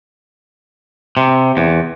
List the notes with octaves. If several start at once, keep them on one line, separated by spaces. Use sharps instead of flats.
C3
E2